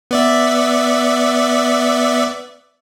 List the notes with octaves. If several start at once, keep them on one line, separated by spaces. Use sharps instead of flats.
B3 D5 E5